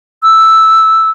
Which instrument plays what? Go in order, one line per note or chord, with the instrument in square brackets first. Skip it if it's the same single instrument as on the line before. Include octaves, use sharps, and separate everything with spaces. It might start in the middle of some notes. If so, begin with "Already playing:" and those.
[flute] E6